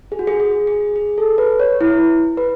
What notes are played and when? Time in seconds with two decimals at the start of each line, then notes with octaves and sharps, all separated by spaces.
0.12 G#4
0.19 F#4
0.27 G#4
0.40 G#4
0.67 G#4
0.96 G#4
1.18 A4
1.38 B4
1.60 C#5
1.81 E4
2.37 B4